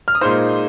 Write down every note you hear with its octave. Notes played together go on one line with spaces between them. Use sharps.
F6
D#6
A#2 G#3 D#4 C5 C6